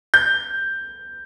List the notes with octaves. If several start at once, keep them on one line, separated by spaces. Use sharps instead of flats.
G6